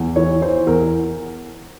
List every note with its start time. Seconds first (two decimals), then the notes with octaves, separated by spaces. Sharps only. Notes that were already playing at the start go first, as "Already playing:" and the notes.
Already playing: E2
0.16 E3 C#5
0.41 E3 C5
0.66 E2 A#4